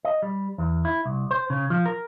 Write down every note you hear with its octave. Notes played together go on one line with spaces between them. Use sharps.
D#5
G3
E2
E4
C2
C5
C#3
F3
A#4